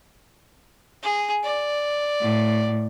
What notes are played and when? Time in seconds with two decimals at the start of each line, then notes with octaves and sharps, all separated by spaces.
1.03 G#4
1.44 D5
2.21 A2